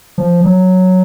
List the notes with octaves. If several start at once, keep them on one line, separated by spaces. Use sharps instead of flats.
F3
F#3